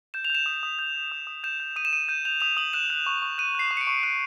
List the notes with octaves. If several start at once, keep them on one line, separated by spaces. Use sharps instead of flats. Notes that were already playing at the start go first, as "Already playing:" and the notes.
G6 E7
F7
G6 E7
D#6
D#6
G6
G6
D#6
D#6
G6 E7
G6
D#6 D#7
E7
D#6 D#7
G6 D#7
G6 F7
D#6 F7
D#6 F#7
F#6 E7
F#6
C#6
C#6
F#6 D#7
F#6 C7
C#6
C#7
D7
C#6
F#6 D#7